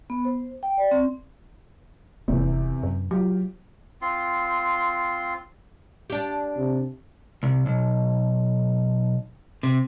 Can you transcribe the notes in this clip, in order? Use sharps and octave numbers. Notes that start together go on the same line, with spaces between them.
B3
C5
G5
D5
C4
E1 E2 C3
F#2
F#3 F4 G4
C4 F4 C6
D4 G4
C3
C2
B1
C3